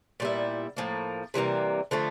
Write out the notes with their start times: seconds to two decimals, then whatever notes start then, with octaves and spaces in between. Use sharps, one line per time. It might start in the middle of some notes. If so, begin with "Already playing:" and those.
0.20 A#2 G3 B3 E4
0.77 A2 F3 A#3
1.34 C3 E3 G3 A#3
1.91 D3 F3 A3